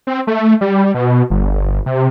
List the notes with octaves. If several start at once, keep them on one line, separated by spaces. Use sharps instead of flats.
C4
A3
G3
B2
G1
C3